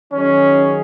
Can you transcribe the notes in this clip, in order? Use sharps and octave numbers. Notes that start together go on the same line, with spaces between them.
D#3 F#3 C#4 D#4 G#4